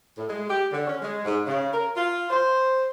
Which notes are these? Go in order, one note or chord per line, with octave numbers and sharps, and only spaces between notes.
A2
G#3
G4
D3
C#4
G#3
G#2
C#3
A#4
F4
C5